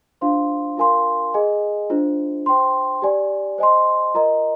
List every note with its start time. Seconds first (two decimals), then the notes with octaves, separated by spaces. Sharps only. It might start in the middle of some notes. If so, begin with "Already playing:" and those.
0.21 D4 F4 C5 F5 C6
0.77 F4 A#4 F5 G#5 C6
1.34 G#4 D#5 G#5
1.90 D4 F4 C5
2.46 C5 G5 C6
3.02 G4 D5 G#5
3.58 C5 D#5 G#5 C6
4.14 F4 A#4 D#5 A#5